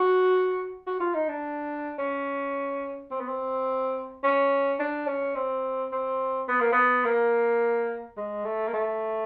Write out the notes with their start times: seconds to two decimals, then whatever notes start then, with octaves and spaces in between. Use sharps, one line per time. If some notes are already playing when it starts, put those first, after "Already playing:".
Already playing: F#4
0.86 F#4
1.00 F4
1.14 D#4
1.28 D4
1.98 C#4
3.11 C4
3.20 B3
3.28 C4
4.24 C#4
4.80 D4
5.08 C#4
5.36 C4
5.92 C4
6.48 B3
6.60 A#3
6.73 B3
7.05 A#3
8.17 G#3
8.45 A3
8.68 A#3
8.73 A3